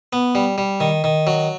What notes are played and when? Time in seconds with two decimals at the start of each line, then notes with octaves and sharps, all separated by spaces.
0.13 B3
0.35 G3
0.58 G3
0.80 D#3
1.04 D#3
1.27 F#3